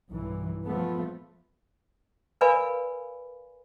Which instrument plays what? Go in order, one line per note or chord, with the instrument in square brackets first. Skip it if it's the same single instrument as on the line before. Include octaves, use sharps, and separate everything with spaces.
[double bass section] B1 G2 E3
F3 A3 B3
[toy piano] A#4 B4 D5 F5 G#5 B5